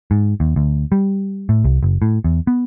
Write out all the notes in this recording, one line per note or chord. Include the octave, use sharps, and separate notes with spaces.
G#2
D#2
D2
G3
A2
C2
F#1
A2
E2
B3